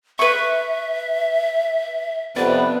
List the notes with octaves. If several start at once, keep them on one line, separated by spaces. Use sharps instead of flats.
B4 E5 C#6
F2 C3 B3 D4 B4